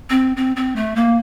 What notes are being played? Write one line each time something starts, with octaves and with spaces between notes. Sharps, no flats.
C4
C4
C4
A3
A#3